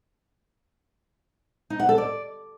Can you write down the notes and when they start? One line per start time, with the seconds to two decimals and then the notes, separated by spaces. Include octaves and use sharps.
1.70 D#4
1.80 F#5
1.89 A4
1.98 D5